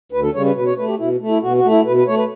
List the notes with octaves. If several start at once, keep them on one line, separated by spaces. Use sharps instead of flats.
D2 B4
A4
C#3 G3 C#5
B4
B2 B4
C#5
A3 B4
G4
B2 E4
A3
E4
B2 F#4
F#4
A3
E4
B2 B4
B4
A3 C#5
B4